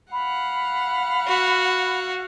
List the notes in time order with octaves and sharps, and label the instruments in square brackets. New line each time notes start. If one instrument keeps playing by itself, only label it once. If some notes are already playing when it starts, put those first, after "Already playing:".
[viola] F5 F#5 [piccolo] B5
[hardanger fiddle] F#4